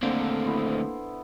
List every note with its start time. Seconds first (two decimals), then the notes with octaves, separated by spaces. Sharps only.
0.03 D2 D3 A#3 C4
0.46 B3 E4 C5